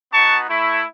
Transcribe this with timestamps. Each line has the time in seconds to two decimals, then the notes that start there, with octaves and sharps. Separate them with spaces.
0.12 B3 D#4 F#4 A5 C#6
0.49 A3 E4